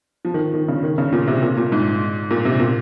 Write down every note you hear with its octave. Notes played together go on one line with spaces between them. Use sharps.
F3
D#3
D#3
C#3
D#3
C#3
A#2
C3
A#2
A#2
G#2
A#2
C3
A#2